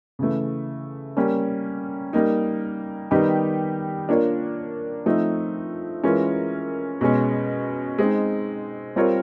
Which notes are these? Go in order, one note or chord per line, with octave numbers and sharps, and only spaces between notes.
C#3 E3 A3
G3 A#3 C#4
G3 A#3 D#4
D#3 G3 B3 D#4 G4
A#3 D4 F4 A#4 C#5
F3 A3 C4 D#4
E3 G#3 C#4 F4 A#4
B2 G#3 C#4
G#3 C4 D#4
G3 C4 F4 A#4 C#5